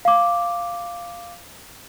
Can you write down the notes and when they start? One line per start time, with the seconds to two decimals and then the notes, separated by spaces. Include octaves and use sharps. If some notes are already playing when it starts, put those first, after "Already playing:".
0.05 F5 D6